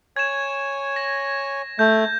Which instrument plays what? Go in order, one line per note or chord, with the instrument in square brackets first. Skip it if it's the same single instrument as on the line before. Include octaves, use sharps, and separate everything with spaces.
[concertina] C#5 G#5 [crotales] G#6 E7
[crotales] A#6
[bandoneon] A3 [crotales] G6